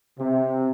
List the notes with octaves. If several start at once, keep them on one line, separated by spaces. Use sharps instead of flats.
C3